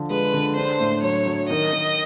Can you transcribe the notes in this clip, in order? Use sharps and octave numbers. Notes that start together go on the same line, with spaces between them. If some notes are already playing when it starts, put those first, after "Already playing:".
Already playing: D3 F3
G#3 B4
D3
D4 C5
A2
F#3 C#5
F#3
D#3 D#5
D#3